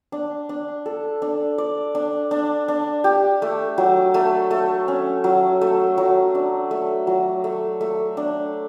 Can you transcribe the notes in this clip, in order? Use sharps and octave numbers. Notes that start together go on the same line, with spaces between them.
D4
D4
A4
D4
D5
D4
D4
D4
G4
A3
F#3
A3
A3
C#4
F#3
A3
F#3
D4
A3
F#3
A3
A3
D4